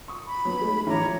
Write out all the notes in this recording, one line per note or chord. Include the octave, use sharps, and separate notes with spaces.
C#6 D#6
B5
F#3 B3
G#3 A3 D#4
A1 F3 C#5 A#5 D6